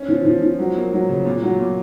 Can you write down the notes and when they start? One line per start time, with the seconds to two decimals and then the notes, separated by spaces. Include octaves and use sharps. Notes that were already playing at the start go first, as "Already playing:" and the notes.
Already playing: C#4
0.08 F3
0.25 F3
0.42 F3
0.59 F#3
0.75 A#3
0.92 F#3
1.09 C#3
1.25 A#2
1.42 F#3
1.59 A#2